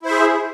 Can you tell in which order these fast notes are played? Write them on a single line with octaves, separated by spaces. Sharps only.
E4 C5 E5 G#4